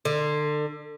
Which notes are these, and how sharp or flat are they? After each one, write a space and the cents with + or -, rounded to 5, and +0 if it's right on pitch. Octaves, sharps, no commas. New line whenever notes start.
D3 +30